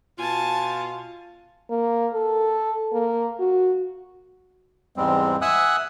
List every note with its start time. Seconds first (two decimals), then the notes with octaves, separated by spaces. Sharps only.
0.18 B2 F4 G#5 A5
1.70 A#3
2.14 A4
2.93 A#3
3.40 F#4
4.96 E2 G#2 G3 G#3 C4
5.42 E5 F#5 G#5 D#6 E6 F#6